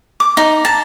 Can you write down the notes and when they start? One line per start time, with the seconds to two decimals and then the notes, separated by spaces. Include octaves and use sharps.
0.20 D6
0.37 D#4
0.65 A5